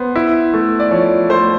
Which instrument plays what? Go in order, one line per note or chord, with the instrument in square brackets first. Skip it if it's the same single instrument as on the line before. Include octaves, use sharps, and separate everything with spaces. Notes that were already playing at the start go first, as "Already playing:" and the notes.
Already playing: [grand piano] B3 [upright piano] C5
[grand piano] E4
A3
[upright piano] D5
[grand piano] F3 [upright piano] C#5
[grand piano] A3 [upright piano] C5